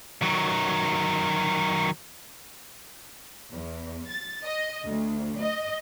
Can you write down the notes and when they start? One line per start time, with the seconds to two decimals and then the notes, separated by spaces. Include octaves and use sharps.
0.22 D#3 F#3
3.53 E2
4.09 A6
4.45 D#5
4.85 D2
5.41 D#5